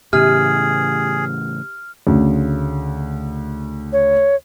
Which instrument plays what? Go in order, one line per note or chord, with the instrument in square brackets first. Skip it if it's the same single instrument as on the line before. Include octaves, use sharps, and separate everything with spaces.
[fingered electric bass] A2 C#3 E3 [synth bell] G4 [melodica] G#4 [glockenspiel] F6
[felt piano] D2 C#3
[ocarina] C#5